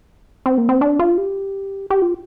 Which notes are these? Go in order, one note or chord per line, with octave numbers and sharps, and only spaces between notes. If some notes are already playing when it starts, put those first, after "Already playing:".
C4
A#3
C4
D4
F4
G4
G4
F4